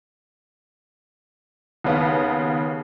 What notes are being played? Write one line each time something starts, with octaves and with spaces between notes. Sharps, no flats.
D#2 C#3 B3